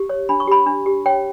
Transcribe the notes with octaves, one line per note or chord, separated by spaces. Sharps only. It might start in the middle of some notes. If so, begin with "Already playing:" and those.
Already playing: G4
C#5
D4 B5
C#6
G4 B5
D4
G4
C#5 G5